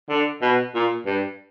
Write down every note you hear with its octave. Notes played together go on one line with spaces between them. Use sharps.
D3
B2
A#2
G2